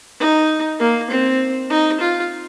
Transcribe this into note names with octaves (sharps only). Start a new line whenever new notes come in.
D#4
A#3
C4
D#4
F4